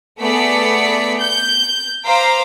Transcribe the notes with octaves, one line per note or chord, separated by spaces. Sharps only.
A3 B3 G#4 D5 B6 C#7
G6
C5 F5 A#5 D6 B6